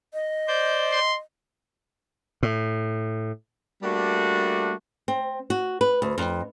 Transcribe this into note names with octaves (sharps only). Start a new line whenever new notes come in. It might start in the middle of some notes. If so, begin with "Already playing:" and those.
D#5
C5 D5 G6
C6
A2
G3 A3 A#3 D4 F#4
C4
F#4
B4
D2
F2